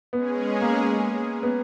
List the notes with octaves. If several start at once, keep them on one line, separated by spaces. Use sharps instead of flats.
G#3 B3 C#4 G#4
A#3
B3